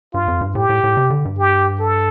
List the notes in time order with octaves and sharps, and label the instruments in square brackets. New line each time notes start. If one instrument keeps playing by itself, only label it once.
[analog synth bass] G2 [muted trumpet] F4
[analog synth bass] F2
G2
[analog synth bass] A2 [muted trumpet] G4
[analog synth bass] A2
A2
C3
D3
G2
[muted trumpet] G4
A4